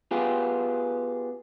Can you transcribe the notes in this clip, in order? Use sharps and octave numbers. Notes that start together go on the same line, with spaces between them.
B3 F4 G4 G#4